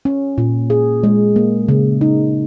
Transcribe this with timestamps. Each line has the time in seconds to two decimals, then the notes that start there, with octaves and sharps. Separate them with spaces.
0.05 C#4
0.38 A#2
0.70 G#4
1.04 G#3
1.36 A#3
1.68 C#3
2.01 D#4